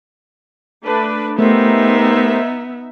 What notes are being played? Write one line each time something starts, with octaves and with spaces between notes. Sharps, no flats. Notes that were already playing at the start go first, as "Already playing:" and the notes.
A3 D4 B4
A3 B3 D#4 G4 A#4 C5 E5